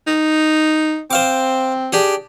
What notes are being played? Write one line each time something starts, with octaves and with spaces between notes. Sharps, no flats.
D#4
C4 C5 F5 D6
D4 G4 G#4